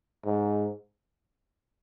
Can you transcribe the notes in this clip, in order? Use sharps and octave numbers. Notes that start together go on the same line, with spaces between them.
G#2